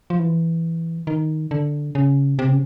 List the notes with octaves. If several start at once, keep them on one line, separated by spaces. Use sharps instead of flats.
F3
E3
D#3
D3
C#3
C3
C#3